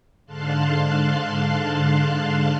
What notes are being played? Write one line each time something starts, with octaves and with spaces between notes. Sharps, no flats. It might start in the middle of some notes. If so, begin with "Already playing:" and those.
G#2 D3 F5 A5 C6 F#6